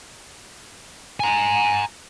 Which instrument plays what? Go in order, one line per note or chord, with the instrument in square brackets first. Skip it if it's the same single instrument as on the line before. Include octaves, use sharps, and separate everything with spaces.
[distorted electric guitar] G#5 A#5